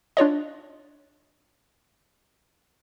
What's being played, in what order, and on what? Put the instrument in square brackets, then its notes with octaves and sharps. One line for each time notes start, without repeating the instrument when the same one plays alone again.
[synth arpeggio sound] D4 F4 C#5 D#5